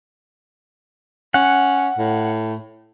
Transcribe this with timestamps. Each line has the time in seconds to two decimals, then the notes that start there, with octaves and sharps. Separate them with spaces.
1.34 C#4 F#5
1.98 A2